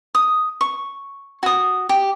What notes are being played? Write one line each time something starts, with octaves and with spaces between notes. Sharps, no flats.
D#6
C#6
F#4 D#6
G4